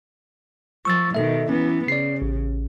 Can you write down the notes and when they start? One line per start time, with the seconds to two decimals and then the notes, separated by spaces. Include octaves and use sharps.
0.85 F3 C#6 E6 A6
1.15 B2 D#3 A4 E5
1.49 E3 B3 C#4
1.88 C#3 D5 C7
2.22 A1